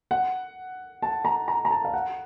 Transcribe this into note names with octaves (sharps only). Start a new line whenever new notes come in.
F#5
A5
A#5
A#5
A#5
A5
F5
F#5